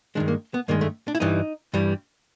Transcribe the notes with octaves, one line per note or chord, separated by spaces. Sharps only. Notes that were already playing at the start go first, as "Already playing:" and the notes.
G2 D#3 G#3 D4
A#3
B3
G2 D#3 G#3 A#3
A3
D4
E4
G2 E3 G3 D#4
G2 E3 G3